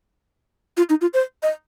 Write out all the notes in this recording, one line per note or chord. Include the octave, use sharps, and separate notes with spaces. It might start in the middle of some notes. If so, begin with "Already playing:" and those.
F4
D#4
F4
C5
D#5